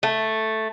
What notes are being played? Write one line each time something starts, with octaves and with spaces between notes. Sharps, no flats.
A3